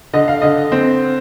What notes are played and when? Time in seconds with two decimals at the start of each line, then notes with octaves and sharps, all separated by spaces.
0.13 D3 D#5
0.28 F5
0.42 D3 D#5
0.72 C4